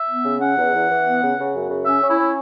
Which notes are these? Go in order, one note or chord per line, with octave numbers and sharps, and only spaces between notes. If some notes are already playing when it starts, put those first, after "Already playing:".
Already playing: E5
B3
C#3
C#4 F#5
E2
E2
E3
B3
C#3
C#3
F#2
C#3
C#4 E5
C#4
E4
C#4